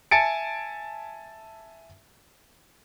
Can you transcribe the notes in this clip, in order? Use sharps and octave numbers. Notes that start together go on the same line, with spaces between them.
E5 G#5 A5 A6 C#7 D7